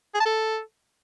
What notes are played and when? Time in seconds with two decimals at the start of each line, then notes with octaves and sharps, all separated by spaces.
0.15 G#4
0.20 A5
0.26 A4